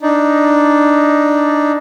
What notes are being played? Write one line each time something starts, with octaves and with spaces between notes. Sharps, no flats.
D4 D#4